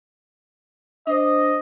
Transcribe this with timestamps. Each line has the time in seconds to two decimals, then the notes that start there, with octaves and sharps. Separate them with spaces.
1.07 D4 C5 D#5